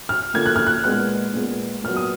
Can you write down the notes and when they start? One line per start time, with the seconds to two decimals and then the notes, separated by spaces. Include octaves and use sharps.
0.09 F6
0.34 D3 F3 A#3 G#6
0.46 F#6
0.56 F6
0.66 F#6
0.84 A#2 G#3 B3 F#6
1.34 A#2 G#3 B3
1.84 A#2 F#3 B3 F6
1.96 D#6